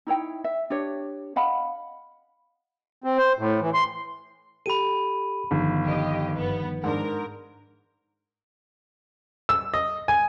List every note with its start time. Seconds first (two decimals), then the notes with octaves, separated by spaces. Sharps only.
0.07 D#4 E4 C#5 G5
0.44 E5
0.70 D4 G4 C#5
1.36 D#5 F5 F#5 B5
3.04 C4
3.17 C5
3.39 A2
3.61 E3
3.74 C6
4.66 G4 A4 B5 D#7
5.51 G1 D#3 F3 D#4
5.86 G4 D#5
6.33 G1 B3
6.84 G#2 D4 A#4
9.49 E6
9.74 D#5
10.08 G#5